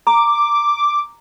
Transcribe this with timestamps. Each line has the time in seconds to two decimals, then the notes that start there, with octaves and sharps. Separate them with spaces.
0.07 A#5 D6